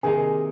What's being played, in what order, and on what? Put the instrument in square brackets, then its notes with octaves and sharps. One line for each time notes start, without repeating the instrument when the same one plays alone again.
[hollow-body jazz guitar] C3 D#3 A#3 D#4 [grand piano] G#4